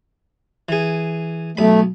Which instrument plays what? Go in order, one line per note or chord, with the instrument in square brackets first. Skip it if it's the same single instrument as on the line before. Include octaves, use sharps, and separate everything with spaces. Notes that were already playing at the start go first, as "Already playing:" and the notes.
[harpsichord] E3 G#4
[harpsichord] B1 B5 [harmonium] A3